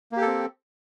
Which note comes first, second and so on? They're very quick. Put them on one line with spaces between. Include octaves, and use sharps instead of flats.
A#3 G4 A4 C4